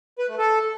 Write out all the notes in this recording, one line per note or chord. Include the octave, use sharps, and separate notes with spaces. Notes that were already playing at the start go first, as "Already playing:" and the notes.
B4
A3
A4